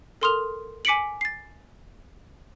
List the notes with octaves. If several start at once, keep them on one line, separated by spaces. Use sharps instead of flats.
A4 A#4 C6 D#6 F6 F7
G#5 D6 B6 C#7 D7 F#7
A6 C7